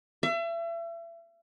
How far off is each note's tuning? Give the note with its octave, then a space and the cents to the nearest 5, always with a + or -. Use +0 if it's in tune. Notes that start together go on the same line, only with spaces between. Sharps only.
E5 +35